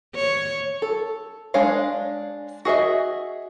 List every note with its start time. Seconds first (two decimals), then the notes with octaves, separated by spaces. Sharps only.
0.15 C#5
0.82 A4
1.54 G#3 D4 C#5 F5
2.65 F#4 G#4 D#5 E5